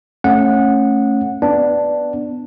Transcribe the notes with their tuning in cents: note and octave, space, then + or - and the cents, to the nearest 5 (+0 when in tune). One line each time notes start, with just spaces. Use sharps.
A3 +0 C#4 -20 F#5 -15
B3 +0 D4 +0